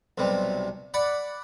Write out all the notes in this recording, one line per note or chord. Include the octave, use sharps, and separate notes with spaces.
B1 C3 G3
D5 F#5 B5